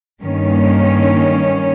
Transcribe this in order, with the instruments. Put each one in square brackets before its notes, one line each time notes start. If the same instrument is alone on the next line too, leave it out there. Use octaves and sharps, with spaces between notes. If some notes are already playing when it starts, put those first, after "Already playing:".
[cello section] G2 D#3 A#3 C#4